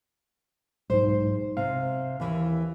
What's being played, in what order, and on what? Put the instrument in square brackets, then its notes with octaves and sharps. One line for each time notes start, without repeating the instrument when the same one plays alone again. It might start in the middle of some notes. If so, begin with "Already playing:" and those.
[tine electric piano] B1 G#2 [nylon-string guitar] C5
[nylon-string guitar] C3 [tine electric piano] F5
[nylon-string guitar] D#2 E3